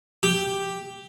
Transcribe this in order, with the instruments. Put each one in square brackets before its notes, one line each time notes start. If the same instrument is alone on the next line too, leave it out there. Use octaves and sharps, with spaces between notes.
[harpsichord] G4